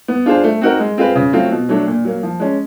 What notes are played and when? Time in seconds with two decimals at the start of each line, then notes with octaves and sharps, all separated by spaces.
0.08 B3
0.26 D4 F4 G#4 C5
0.44 A3
0.61 C4 D#4 F#4 A#4
0.80 G#3
0.98 C4 F4 G#4 B4
1.15 C#3
1.33 F#3 A3 C4 F4
1.52 B2
1.69 F#3 A3 D4
1.87 A#2
2.05 F#3 A#3
2.23 F3
2.40 G#3 C#4